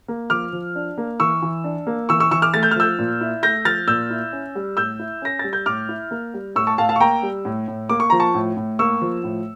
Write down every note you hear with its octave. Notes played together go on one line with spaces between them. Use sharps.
A#3
F3 D6 F6
F3
D4
A#3
E3 C#6 E6
E3
D4
A#3
E3 C#6 E6
C#6 E6
E3 C#6 E6
D6 F6
A3 A6
G6
F6
F3 E6 G6
A#2
E4
A3 G6 A#6
F3 F6 A6
A#2 E6 G6
E4
C#4
G3
A2 E6 G6
E4
C#4 A#6
G3 A6
G6
A2 D6 F6
E4
A#3
G3
A2 C#6 E6
A5 C#6
A2 F5 A5
F5 A5
C#6
A#3 G5 A#5
G3
A2
A2
A#3 D6
C#6
F3 A#5
A5 C#6
A2
A2
A#3 C#6 E6
F3
A2